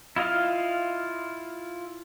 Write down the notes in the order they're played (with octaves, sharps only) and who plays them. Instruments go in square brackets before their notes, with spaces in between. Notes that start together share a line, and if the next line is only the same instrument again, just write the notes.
[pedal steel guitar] E4 F4 D#5 F5